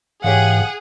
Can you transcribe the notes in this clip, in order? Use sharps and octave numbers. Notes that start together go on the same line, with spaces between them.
G#2 E3 G4 G#4 C#5 F5 F#5